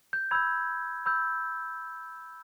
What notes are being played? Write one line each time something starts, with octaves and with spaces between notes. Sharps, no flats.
G6
B5 E6 G6 G#6
B5 E6 G6